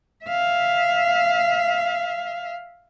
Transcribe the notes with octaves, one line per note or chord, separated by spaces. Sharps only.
E5 F5